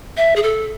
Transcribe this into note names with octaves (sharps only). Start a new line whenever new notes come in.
E5
G#4
A4